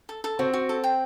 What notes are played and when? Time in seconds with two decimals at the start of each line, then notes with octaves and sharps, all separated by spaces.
0.09 A4
0.24 A4
0.39 C4 F#4
0.54 F#4
0.69 A4
0.84 G5